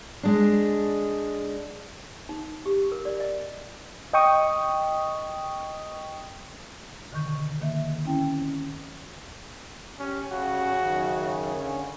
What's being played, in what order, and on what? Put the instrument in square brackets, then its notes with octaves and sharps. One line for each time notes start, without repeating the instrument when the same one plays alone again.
[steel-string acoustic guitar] G#3 D4
[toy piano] D#4
G4
A#4
D5
D#5
[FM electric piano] D#5 G5 C#6 D#6
[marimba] B2 D3 D#3 C#6 G6
D3 D#3 A#3 E5
C4 C#4 E4 G5 A5
[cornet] C#4 [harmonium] G4
[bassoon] C#3 [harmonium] G3 C#4 [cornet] F#4
[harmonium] F#2 D#3
D3 C#4